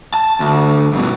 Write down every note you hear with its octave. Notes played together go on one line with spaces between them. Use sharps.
A5
D2
G2 B2